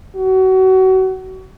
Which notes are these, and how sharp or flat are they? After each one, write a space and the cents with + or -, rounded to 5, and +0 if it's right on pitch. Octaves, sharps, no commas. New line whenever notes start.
F#4 +30